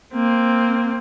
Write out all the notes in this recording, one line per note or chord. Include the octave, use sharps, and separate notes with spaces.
A#3 C4